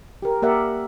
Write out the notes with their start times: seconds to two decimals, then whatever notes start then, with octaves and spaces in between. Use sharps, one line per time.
0.22 G4 A#4
0.42 A#3 G4 A#4 D5 E5 F#5